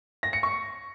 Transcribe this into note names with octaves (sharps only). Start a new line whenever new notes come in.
A#6
C#7
C#6